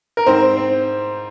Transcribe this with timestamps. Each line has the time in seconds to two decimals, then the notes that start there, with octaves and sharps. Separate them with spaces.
0.17 A#4
0.26 G#2 C4 C5
0.57 C4